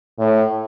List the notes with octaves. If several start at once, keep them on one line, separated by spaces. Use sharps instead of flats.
A2